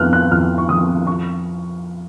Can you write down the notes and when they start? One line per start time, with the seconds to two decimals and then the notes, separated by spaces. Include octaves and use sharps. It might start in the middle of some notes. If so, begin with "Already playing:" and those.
Already playing: F2 B3 F6 F#6
0.13 F#6
0.31 F2 F6
0.58 C#6
0.69 F3 D#6
1.07 C#6